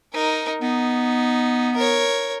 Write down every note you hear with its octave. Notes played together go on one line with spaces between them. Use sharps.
D#4 A#4
B3 D#4
A#4 C#5